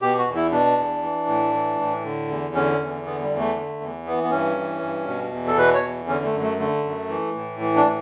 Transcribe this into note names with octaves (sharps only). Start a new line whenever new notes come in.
B2 G4
F#4
E2
E4
B2 D4
E2
E3
A2
E3
A2
D3
E2
D3 C#4
E2
D3 B3
G3
E2
A3
D3
E2
E3 B3
B3
G2 C#4
E3
G2
B2
E2
A4
B2 B4
C#5
E2
D3 C#4
A3
F#2
A3
D3 A3
F#2
E3
A2
E3
D4
A2